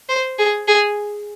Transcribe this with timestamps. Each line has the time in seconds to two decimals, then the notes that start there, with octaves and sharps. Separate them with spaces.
0.09 C5
0.38 G#4
0.68 G#4